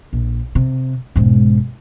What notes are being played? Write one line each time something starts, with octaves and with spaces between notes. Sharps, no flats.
A#1
C3
E1 G#2